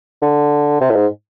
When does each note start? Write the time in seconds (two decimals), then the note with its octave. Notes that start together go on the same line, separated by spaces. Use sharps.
0.22 D3
0.81 C3
0.90 A2
0.96 G#2